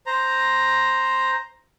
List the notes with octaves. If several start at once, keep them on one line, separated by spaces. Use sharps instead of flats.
C5 A#5